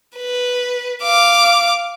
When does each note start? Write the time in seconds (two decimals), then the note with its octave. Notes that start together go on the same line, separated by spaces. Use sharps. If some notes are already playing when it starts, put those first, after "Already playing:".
0.17 B4
1.03 F5 D6